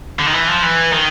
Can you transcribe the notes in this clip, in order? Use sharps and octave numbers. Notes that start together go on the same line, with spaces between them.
D3
D#3
E3
F3
E3
D#3